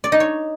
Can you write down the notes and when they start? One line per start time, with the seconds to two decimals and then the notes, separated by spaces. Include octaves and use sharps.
0.04 D5
0.12 D#4
0.20 C#5